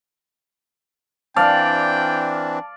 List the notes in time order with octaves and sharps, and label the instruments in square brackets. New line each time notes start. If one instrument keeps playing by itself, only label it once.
[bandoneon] E3 C4 D4 [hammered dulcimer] D5 F5 [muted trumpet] G5 [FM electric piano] A5